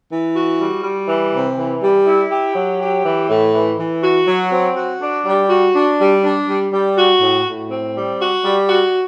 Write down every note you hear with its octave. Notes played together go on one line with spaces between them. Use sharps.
E3
F#4
G3
G3
E3
C3
E3
G3
E4
G4
F#3
G4
E3
A2
E3
E3
F#4
F#3
C4
F#4
D4
G3
F#4
D4
G3
D4
G3
G3
F#4
A2
A2
C4
G3
F#4
G3
F#4